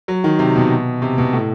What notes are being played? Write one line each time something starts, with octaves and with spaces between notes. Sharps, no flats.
F#3
D#3
C3
B2
C3
B2
A2